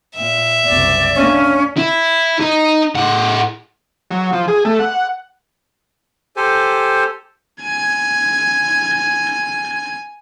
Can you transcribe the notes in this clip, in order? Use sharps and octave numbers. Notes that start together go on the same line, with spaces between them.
A#2 E5
F#1 C2 D5
A#3 C#4 D4
E4
D#4
A2 F#5
F#3
F3
G#4
A3
F#5
G4 A4 C5 G#5
G#5 G#6